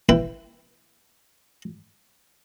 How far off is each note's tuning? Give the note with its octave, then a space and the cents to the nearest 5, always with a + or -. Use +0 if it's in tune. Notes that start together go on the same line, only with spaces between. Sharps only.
E4 +15 B4 +0 G5 +0